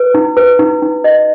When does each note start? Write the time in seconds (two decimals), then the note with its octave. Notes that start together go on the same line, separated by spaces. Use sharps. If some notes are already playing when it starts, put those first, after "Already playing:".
Already playing: B4
0.14 D#4
0.37 B4
0.59 D#4
0.82 D#4
1.04 D#5